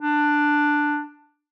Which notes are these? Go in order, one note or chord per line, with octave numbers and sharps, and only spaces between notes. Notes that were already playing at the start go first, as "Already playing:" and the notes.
D4